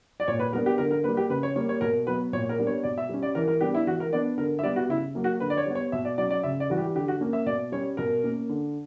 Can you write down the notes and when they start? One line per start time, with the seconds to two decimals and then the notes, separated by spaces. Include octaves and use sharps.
0.20 D5
0.28 A#2 C#5
0.39 B4
0.53 G3 B3 D4 A#4
0.66 G4
0.78 D3 A#4
0.91 A#4
1.04 G3 A#3 B4
1.17 G4
1.30 C#3 B4
1.43 C#5
1.56 G3 A#3 C#5
1.69 C#5
1.81 B2 A#4
2.07 F#3 B3 B4
2.33 A#2 C#5
2.49 A#4
2.58 G3 B3 D4
2.67 C#5
2.83 B2 D5
2.98 E5
3.09 G3 C#4
3.22 D5
3.35 E3 A#4
3.48 A#4
3.61 G3 B3 D4 G4
3.75 E4
3.87 E3 F#4
4.00 A#4
4.13 B3 D4 D5
4.38 D3 A#4
4.59 E5
4.63 G3 B3 D5
4.76 F#4
4.89 C#3 E4
5.15 F#3 A#3
5.24 F#4
5.40 D3 B4
5.50 D5
5.57 C#5
5.66 G3 B3
5.75 C#5
5.92 B2 E5
6.05 D5
6.18 F#3 C#4 D5
6.30 D5
6.43 C#3 E5
6.60 D5
6.70 E3 G3 F#4
6.78 G4
6.95 D3 G4
7.08 F#4
7.21 A#3 C#4
7.33 E5
7.46 B2 D5
7.72 G3 C#4 C#5
7.97 B2 A#4
8.24 A#3 C#4
8.49 D3